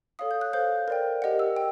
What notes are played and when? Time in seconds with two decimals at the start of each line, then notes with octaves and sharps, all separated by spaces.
0.19 A4 C#5 F5 D#6
0.31 G6
0.41 F#6
0.53 A4 C5 F5 G6
0.88 A#4 D5 G5
1.22 G4 A#4 D#5 F#5
1.39 E6
1.56 G5